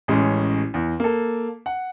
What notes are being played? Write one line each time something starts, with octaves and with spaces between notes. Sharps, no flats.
A1 G#3 C#4
E2
A#3 A4
F#5